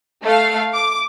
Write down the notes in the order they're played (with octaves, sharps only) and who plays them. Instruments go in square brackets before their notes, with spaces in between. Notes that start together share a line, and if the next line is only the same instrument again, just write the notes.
[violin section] A3 F5
D6